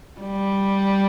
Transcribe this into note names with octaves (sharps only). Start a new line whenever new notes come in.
G3